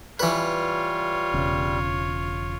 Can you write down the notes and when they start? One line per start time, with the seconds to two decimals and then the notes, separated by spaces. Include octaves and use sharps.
0.20 E3 G3 F4 B4 C#5
1.34 E1 C#3